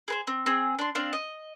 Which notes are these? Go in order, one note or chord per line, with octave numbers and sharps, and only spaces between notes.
G#4 B4 C5
C4
C4 G#4
D4 C6
C4 D4 F5
D#5